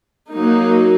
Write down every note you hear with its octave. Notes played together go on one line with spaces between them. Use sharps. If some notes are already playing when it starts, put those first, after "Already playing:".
F#3 A#3 D#4